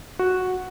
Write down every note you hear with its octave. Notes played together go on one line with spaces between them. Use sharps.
F#4